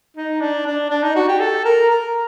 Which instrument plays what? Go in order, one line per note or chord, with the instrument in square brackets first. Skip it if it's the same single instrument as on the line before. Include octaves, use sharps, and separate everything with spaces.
[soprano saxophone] D#4
D4
D4
D4
D#4
F#4
G4
A4
A#4
A#4